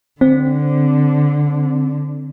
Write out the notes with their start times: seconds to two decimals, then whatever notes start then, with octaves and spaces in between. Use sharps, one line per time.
0.21 D3 C4